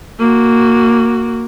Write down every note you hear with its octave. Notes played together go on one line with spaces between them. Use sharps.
A#3 F#4